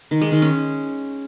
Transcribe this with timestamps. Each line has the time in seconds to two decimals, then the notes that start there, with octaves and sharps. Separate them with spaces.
0.11 D#3
0.21 G#3
0.32 D#3
0.42 C#4